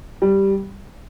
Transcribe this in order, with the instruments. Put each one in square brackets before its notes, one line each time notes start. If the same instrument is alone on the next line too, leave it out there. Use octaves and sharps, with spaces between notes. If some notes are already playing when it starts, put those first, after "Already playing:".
[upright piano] G3